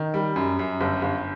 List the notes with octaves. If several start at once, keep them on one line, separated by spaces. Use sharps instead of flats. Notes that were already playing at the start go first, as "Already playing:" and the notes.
Already playing: D#3
G3
F#2
F#2
G1
G1